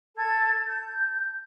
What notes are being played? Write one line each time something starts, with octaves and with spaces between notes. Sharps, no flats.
A4 G#6
G6